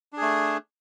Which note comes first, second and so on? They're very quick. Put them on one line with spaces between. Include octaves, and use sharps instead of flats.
D4 G#4 A3